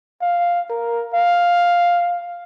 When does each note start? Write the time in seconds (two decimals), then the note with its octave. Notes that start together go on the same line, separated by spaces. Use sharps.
0.21 F5
0.70 A#4
1.14 F5